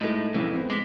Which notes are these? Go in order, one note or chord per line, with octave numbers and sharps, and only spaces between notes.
A2 G#3 A3 D#4
F2 A2 C#3 E3 A3
B3 C4
G#3 D6 B6